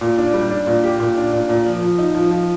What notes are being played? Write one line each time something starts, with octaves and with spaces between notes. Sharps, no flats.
A#2
D4
G3
D4
A#2
G4
A#2
D4
A#2
A#2
F3
F3
D#4
F3
F3